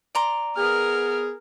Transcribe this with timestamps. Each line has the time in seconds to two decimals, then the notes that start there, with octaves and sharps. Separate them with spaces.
0.15 D5 A#5 C6
0.57 B3 G#4 A#4 F6